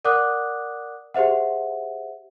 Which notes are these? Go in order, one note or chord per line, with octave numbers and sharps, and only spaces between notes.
A#4 D5 F#5 D6 D#6 F#6
G4 G#4 C5 E5 F#5